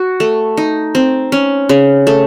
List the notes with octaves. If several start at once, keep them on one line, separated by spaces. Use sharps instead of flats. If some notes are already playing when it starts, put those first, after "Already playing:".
Already playing: F#4
A3
D#4
C4
C#4
C#3
A3